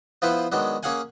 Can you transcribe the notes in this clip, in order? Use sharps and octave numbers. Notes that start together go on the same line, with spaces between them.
F3 B3 E4 F4 B4 C5
D#3 F#3 G#3 B3 D4
A#3 C#4 G#4 F5 F#5 G#5